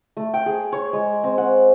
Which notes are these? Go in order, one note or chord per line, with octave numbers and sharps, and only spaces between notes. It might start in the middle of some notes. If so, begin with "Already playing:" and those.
A3
G5
G#4
C#5
G#3
C4
F#5